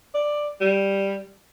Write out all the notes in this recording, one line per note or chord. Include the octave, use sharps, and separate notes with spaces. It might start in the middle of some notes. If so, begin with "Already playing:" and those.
D5
G3